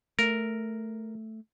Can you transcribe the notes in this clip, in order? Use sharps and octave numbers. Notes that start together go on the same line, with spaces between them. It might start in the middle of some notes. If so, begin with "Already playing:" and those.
A3 A#4